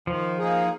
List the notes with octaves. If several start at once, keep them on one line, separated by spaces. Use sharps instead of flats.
D#3 F3
A#3 D#4 G#4